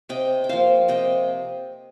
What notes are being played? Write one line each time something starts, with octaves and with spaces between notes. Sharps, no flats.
C3 D#5 G5
G5
F3 A#3 C5 F5
C3 D#5 G5